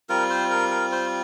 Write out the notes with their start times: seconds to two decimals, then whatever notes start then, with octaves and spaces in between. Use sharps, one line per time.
0.09 G3 C4 F4 A#4
0.30 C5
0.50 A#4
0.71 A#4
0.92 C5